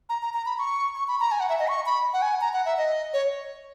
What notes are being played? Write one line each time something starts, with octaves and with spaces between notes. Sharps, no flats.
A#5
A#5
A#5
B5
C#6
C#6
B5
A#5
G#5
F#5
E5
D#5
C#6
B5
F#5
G#5
A#5
F#5
E5
D#5
C#5